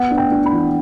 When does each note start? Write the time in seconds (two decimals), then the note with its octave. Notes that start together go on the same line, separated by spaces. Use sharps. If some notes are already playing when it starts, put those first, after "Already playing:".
Already playing: B3 F#5
0.11 D4
0.17 G5
0.31 D4
0.46 B5
0.52 E3